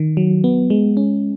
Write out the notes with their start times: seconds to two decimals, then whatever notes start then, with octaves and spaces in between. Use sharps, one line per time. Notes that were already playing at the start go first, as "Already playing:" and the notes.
Already playing: D#3
0.17 F#3
0.44 B3
0.70 G#3
0.97 C#4